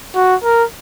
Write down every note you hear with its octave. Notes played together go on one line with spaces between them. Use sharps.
F#4
A#4